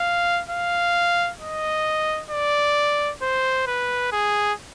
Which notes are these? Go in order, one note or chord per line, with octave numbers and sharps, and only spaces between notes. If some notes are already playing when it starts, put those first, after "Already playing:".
Already playing: F5
F5
D#5
D5
C5
B4
G#4